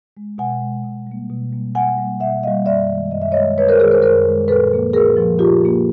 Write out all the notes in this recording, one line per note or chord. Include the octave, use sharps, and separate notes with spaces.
G#3
B2 F#5 G#5
G#3
B2
G3 A#3
B2
G3 A#3
B2 F#5 G#5
G3 A#3
B2 E5 F#5
G3 A#3 D#5 F5
F#2 D5 E5
D#3 G#3
F#2 D#5
E5
C#5 D#5
D#3 G#3
F#2 B4 C#5
A#4 C5
D#3 G#3 G#4 A#4
A#4 C5
F#2 A#4 C5
D#3 G#3
A#2 A4 B4
F3 A#3
A#2 G#4 A#4
F3 A#3
A#2 F4 G4
F3 A#3